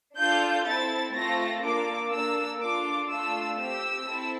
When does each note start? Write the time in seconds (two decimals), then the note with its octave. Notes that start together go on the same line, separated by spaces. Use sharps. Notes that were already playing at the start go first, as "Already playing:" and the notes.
0.17 D4 F4 A4 G6
0.66 C4 E4 A4 A6
1.15 A3 C4 F4 A4 A#6
1.63 A#3 D4 F4 A4 D6
2.12 A#3 D4 A4 E6
2.61 D4 F4 A4 D6
3.09 A3 D4 F4 A4 E6
3.57 C4 G4 E6
4.06 C4 E4 A4